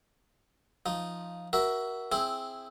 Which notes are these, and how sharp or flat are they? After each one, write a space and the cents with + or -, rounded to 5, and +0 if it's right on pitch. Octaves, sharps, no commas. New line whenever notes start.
F3 +0 D#4 +0
F#4 +20 A#4 +20 E5 +0
C4 +0 E4 +0 G#4 +0